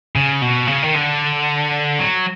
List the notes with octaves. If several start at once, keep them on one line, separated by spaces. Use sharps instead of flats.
C#3
B2
C#3
D#3
D3
F#3